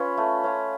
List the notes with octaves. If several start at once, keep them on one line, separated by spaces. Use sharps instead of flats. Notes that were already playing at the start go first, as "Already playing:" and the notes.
Already playing: C#4 F4 B4
A3
C#4 F4